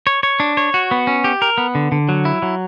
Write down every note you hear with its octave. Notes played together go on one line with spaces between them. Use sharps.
C#5
C#5
D4
C#5
F#4
B3
C#4
G4
A#4
B3
D3
D3
F#3
E4
F#3